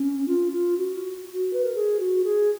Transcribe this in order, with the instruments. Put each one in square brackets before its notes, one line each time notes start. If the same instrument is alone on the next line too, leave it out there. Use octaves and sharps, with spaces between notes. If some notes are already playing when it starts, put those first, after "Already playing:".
Already playing: [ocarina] C#4
F4
F4
F#4
B4
A#4
G#4
F#4
G#4